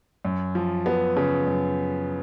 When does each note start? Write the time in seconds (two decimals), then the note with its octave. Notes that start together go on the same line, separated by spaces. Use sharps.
0.25 F#2
0.55 F3
0.86 B3
1.16 C#3
1.47 F#2